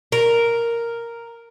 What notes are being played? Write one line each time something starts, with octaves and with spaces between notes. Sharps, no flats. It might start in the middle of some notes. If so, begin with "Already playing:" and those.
A#4